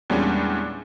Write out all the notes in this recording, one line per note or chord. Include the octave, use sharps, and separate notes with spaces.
E2 A#2 G3 G#3 C#4 D4